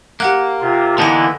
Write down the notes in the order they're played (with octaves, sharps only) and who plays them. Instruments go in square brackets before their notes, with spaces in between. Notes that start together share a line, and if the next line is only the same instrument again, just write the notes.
[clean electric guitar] A#3 [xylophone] G4 F#5 F#6
[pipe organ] C3 F4
[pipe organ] D3 E3 E4 [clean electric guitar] A#3 B3 D#4 [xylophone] A5 A#6